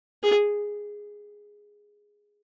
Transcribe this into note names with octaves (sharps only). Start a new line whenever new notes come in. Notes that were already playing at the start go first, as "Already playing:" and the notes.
G#4